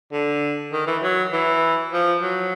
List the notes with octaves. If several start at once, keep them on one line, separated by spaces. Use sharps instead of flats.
D3
D#3
E3
F#3
E3
F3
F#3